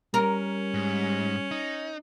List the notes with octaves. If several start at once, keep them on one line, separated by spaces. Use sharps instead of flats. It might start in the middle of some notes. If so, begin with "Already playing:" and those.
G3 C#4 A#4
G#2
D#4